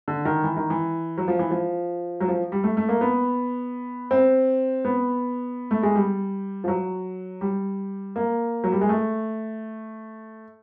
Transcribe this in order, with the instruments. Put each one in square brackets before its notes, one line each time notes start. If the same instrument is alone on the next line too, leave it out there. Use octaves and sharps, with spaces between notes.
[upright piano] D3
D#3
E3
D#3
E3
F#3
F3
E3
F3
F#3
F3
G3
A3
A3
A#3
B3
C4
B3
A3
G#3
G3
F3
F#3
G3
A#3
F#3
G3
G#3
A3